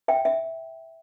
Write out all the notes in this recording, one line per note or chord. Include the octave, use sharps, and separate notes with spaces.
E5 G5
E5